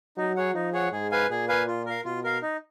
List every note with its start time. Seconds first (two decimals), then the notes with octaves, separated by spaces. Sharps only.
0.17 F#3 D#4
0.36 G#4 C#5 F#5
0.54 F3 D#4
0.73 G#4 C#5 F#5
0.92 G#2 G#4
1.11 B4 F5 G#5
1.30 A#2 G#4
1.49 B4 F5 G#5
1.67 F4
1.86 A#4 F5
2.05 B2 F4
2.24 A#4 F5
2.42 D#4